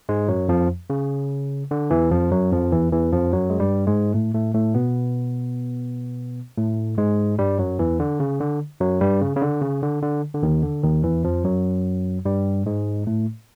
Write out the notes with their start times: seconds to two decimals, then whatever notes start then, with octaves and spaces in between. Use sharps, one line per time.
0.09 G#2 G#3
0.28 F#2 F#3
0.49 F2 F3
0.90 C#3
1.71 D3
1.90 E2 E3
2.11 F2 F3
2.32 F#2 F#3
2.52 F2 F3
2.72 E2 E3
2.92 E2 E3
3.13 F2 F3
3.33 F#2 F#3
3.50 G#3
3.60 G2 G3
3.87 G#2 G#3
4.14 A2 A3
4.34 A2 A3
4.54 A2 A3
4.74 B2 B3
6.57 A2 A3
6.98 G#2 G#3
7.39 G2 G3
7.59 F#2 F#3
7.79 E2 E3
8.00 D3
8.20 C#3
8.40 D3
8.80 F#2 F#3
9.01 G2 G3
9.21 C#3
9.36 C#3
9.42 D3
9.62 C#3
9.82 D3
10.02 D3
10.34 D3
10.43 D#2 D#3
10.63 D3
10.83 D#2 D#3
11.04 E2 E3
11.24 F2 F3
11.44 F#2 F#3
12.25 G2 G3
12.66 G#2 G#3
13.07 A2 A3